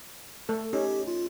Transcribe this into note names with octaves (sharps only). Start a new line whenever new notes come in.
A3 A4
C#4 D#4 G4
F4